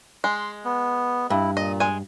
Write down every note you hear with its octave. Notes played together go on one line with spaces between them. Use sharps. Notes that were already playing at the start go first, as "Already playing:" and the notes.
G#3 C6
B3
G2 E4
A#2 D#5
G#3 G#5